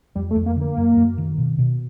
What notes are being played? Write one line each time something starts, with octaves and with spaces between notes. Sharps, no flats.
F2 G3
A3
F2
A#3
D3 A#3
F#2
F#2
D#3
B2
B2